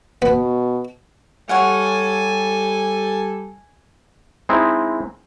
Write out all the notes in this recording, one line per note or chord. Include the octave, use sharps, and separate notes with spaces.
B2 B3
G3 A4 C#5 F5 F#5 G#5
G#3 C4 D#4 E4